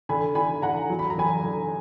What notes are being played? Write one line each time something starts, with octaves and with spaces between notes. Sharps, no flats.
D3 G#5 B5
D3 G#5 B5
D3 F#5 A#5
F#3
B5
A#5
F#2 G#5 B5
D3